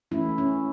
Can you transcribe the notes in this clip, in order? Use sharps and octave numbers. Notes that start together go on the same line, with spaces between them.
E3 A3 C#4 E4
C#4